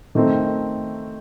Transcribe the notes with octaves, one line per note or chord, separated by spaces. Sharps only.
D#3 A3 C4 D#4